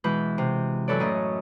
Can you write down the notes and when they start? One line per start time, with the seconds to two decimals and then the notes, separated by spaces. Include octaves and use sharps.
0.04 B2 E3 G#3 B4 G6
0.38 C3
0.88 F#2 A4 B4 C#5 D5
1.00 A2 C#4 A#4 D#5